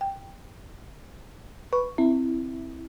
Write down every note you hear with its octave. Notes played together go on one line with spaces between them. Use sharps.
G5
B4 C#6
C4 E4